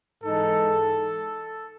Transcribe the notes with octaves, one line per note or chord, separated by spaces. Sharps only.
G#2 E3 G#3 D#4 A4